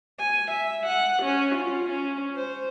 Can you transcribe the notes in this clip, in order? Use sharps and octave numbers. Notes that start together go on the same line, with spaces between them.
G#5
E5
F#5
C#4
F4
C#4
C5